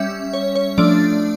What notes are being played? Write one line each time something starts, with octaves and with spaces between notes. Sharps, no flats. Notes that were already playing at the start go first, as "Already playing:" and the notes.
Already playing: G3 C#4 E5
C#5
C#5
F3 A3 D4 D5